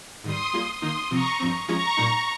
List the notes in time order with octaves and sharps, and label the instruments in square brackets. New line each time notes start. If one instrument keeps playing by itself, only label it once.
[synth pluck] G#2 D#3 G3 [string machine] C6 D#6
[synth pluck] G3 A#3 F4 G#4
[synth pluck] D#3 A#3 D#4 [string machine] C6 D#6
[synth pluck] C3 F3 C4 [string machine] A#5 C#6
[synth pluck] G2 F3 C4
[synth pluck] F3 G#3 C#4 F4 G#4 [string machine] A#5 C#6
[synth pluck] A#2 G3 A#3 D#4